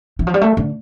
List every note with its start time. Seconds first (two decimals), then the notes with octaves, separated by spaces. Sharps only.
0.19 E3
0.27 F3
0.34 G3
0.41 A3
0.57 D3